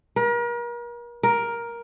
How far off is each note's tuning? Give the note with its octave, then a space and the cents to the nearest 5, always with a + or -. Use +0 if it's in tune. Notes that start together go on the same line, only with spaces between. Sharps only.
A#4 +40
A#4 +10